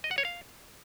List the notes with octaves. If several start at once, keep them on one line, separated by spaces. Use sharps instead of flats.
D#5
F#5
C#5
F5